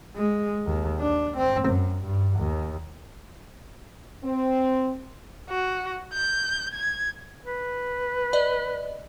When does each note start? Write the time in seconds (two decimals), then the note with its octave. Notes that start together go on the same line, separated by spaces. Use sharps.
0.16 G#3
0.66 D#2
1.00 D4
1.37 C4
1.69 F#2
2.04 G2
2.39 D#2
4.23 C4
5.49 F#4
6.13 G6
6.73 G#6
7.45 B4
8.33 D5 D#5